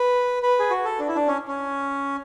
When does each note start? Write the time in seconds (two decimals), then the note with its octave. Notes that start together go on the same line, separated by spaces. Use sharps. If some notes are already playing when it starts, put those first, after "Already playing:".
Already playing: B4
0.43 B4
0.60 G#4
0.71 F#4
0.85 A4
0.99 D4
1.08 E4
1.16 D4
1.27 C#4
1.48 C#4